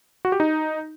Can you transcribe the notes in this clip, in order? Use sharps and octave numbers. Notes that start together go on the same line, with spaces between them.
F#4
G4
D#4